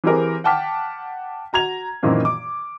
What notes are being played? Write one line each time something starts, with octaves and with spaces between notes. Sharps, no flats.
E3 C4 G4 G#4 A#4
F#5 G5 A5 D6 F6 B6
F#4 A#5 G#6 F7
F#2 A#2 D#3 E3 A#3 C4
D6